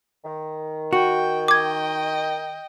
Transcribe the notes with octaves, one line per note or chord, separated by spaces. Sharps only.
D#3
F#4 G5
D#5 G5 D6 G#6